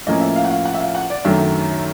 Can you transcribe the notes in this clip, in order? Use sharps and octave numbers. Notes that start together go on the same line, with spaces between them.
A2 F3 A#3 C#4 D#5
E5
F5
F#5
F5
F#5
E5
F5
F#5
D5
F#2 D#3 F#3 A3 D4 E5